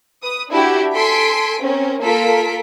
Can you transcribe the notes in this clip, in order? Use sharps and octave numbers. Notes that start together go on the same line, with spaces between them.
B4 D#6
D4 E4 F#4 G4
A4 G#5 C6 B6 D7
C4 C#4 A#4
A#3 F4 A4 A#4 B6 D7